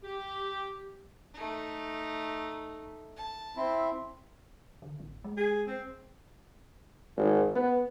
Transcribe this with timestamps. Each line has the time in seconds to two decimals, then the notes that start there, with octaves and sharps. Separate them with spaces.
0.04 G4
1.34 A3 D#4
3.16 A5
3.57 C4 E4
4.82 D3
5.00 A1
5.24 G#3
5.37 G#4
5.67 C4
7.17 G#1
7.55 B3